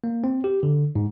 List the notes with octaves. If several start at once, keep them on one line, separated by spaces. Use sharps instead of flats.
A#3
C4
G4
D3
G#2